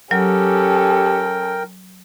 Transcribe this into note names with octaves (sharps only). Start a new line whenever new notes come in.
F#3 C#4 G4 A4 A#4 G5